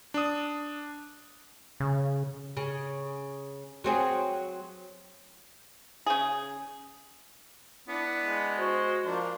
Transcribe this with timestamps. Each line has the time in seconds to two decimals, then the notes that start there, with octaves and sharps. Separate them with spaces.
0.14 D4 D#6
1.80 C#3
2.57 C#3
3.84 F#3 C4 G#4
6.06 C#3 G#4
7.88 B3 D4 E4
8.25 G#3
8.58 F#4 C5
9.05 F3 A#3 D4 C5